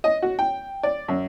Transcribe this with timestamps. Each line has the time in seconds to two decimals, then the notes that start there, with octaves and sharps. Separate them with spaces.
0.04 D#5
0.23 F#4
0.39 G5
0.83 D5
1.08 F#2